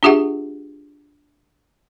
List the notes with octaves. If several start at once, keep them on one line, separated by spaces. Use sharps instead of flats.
D4 F4 G4 G#4 E5 F#5